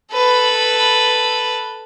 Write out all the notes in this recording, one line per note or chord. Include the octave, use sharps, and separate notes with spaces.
A4 B4